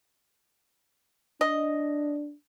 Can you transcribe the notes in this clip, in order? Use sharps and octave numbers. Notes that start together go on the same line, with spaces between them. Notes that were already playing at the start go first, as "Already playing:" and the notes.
D4 D#5